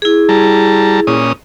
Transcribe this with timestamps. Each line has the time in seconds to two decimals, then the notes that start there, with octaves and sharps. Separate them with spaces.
0.02 E4 G#4
0.29 G3 A5 A#5
1.07 A#2 C#4 D#6